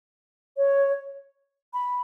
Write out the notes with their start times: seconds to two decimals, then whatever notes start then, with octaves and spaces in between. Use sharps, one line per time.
0.57 C#5
1.74 B5